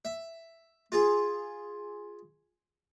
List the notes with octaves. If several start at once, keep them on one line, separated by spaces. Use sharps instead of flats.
E5
F4 G#4